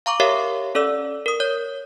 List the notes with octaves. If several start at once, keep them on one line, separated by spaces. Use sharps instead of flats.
F5 A#5 C#6 D6
G4 A#4 C#5 E5 F5
C#4 A4 D5 E6
A#4 D#6
C#5 G6